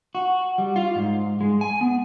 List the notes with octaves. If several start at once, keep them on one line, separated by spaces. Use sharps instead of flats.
F#4
G3
F4
G#2
G#3
G#5
B3